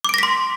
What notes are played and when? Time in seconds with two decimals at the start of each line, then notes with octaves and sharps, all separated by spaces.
0.05 D6
0.09 D7
0.14 A#6
0.18 B6
0.23 C6